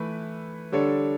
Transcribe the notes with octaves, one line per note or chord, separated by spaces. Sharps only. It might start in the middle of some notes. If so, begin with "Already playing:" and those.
Already playing: E3 A3 E4 B4
D3 G3 D4 A4 C#5